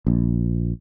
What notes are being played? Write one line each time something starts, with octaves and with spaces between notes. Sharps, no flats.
A#1